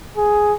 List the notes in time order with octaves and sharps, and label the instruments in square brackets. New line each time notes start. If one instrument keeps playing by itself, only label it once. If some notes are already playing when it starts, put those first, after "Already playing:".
[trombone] G#4